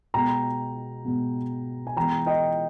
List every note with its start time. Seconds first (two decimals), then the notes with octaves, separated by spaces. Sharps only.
0.14 B2 G#3 B3 G5 A#5
1.05 B2 G#3 B3
1.87 G#5
1.97 E3 G#3 B3 G5 A#5
2.26 D#5 G5